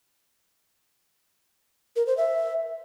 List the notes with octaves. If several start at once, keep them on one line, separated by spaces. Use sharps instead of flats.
A#4
C5
E5